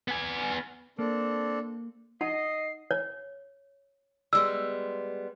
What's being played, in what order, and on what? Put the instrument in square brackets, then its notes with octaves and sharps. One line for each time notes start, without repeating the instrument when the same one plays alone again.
[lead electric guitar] B3 G#5
[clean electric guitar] A#3 [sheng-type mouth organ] C4 D4 A4
[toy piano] D#4 F#5 A5 [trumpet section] D#5 [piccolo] C7
[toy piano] C#5
[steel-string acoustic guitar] G3 G#3 B3 [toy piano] E6